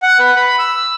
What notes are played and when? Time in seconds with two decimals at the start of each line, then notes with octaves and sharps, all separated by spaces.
0.03 F#5
0.19 B4
0.36 B5
0.59 E6